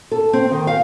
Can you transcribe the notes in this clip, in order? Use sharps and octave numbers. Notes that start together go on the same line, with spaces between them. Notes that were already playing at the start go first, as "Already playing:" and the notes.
A4
C4
D#3
F5